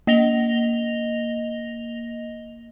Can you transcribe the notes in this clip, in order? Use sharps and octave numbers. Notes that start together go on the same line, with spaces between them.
A#3 D#5 A#6 F7 G7